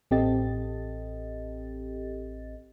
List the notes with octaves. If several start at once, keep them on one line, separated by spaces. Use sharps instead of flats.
A1 C4 G4 A4 D#5 A6